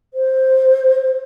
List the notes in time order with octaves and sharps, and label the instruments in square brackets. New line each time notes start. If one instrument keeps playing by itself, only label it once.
[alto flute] C5